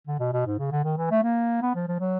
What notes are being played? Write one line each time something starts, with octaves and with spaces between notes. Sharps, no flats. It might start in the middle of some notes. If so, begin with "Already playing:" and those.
D3
B2
B2
G#2
C#3
D3
D#3
E3
A3
A#3
B3
F3
F3
F#3